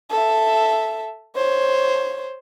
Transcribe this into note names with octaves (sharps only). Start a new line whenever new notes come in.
A4 E5
C5 C#5